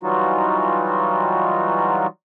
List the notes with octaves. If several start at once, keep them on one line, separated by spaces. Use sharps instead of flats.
E3 F#3 G3 D#4 F4 F#4